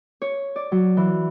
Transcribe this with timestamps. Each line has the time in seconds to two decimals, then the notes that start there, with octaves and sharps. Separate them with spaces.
0.22 C#5
0.56 D5
0.72 F#3
0.97 E3